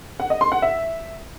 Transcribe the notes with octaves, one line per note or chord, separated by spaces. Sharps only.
F#5
D#5
C6
F#5
E5